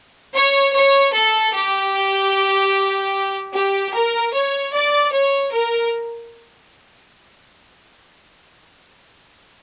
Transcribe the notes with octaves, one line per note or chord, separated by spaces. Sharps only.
C#5
C#5
A4
G4
G4
A#4
C#5
D5
C#5
A#4